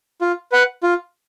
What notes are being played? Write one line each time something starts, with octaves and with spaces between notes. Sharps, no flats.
F4
B4 F#5
F4